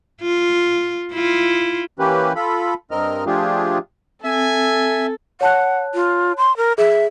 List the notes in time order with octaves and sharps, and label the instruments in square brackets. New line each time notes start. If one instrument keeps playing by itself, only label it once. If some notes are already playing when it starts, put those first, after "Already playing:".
[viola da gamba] F4
E4 F4
[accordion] E3 A#3 C#4 G4 B4
F4 A4 B5
G2 C4 A#4 D#5 F6
F3 A3 D4 F4 G4 G#4
[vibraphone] C4 [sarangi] A4 [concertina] E5 [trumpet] G#5
[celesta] C#5 A5 F#6 [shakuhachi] F#5
[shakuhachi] F4
C6
A#4
[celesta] G#4 [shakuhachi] E5